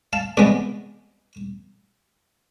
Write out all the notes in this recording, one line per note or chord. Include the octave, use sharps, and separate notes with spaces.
F5 A5
C3 E3 G#3 B3 B4 D5